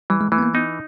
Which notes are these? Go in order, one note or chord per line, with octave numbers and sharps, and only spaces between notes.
E3 G3
G#3
E3 A3
B3
A#3
B3 D#4